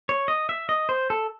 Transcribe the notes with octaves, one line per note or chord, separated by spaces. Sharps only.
C#5
D#5
E5
D#5
C5
A4